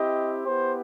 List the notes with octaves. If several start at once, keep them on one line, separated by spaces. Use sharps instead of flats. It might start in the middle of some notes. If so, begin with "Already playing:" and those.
Already playing: C4 E4 G4 D#5
B3 E4 G4 C5